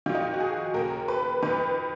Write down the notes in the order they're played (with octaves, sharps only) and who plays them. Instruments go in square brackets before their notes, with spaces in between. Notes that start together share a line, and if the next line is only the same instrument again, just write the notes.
[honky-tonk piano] D#3 F4
F2
D#4
F4
F#4
G#4
D#2 C#3 A#4
B4
F2 D#3 B4